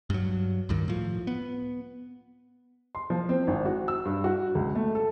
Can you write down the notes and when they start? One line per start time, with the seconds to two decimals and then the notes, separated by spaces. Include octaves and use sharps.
0.10 G2 F#3
0.69 C#2 G2 D#3
0.88 A2 F3
1.27 B3
2.95 C6
3.10 F3
3.29 C4
3.47 G#1
3.65 F#4
3.88 E6
4.05 G2
4.24 F#4
4.55 C#2
4.75 A3
4.95 A4